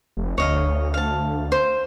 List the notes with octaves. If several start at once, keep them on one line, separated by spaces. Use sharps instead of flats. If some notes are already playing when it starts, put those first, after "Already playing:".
F1
D2 C#5 D#5 F5
F5 A5
C5